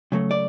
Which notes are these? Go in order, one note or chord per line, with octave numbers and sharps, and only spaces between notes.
C#3 F#3 A3
D5